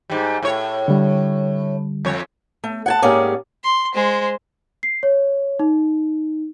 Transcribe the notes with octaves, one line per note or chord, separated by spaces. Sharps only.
G#2 G3
A2 C#5
D3 G3
F2 C#5
A3
F#5 G#5 A5
G#2 A#3 C#4 G4 G#4 D5
C6
G#3 C5
C7
C#5
D#4